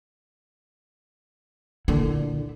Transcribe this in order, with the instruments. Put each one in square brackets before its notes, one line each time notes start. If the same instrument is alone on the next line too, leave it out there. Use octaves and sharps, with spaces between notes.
[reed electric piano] A#2 D3 [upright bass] E4